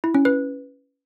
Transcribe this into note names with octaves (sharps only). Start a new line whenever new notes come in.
E4
C#4
B4